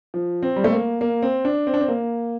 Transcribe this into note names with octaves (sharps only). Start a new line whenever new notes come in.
F3
C4
G3
A3
A#3
A#3
C4
D4
C4
D4
C4
A#3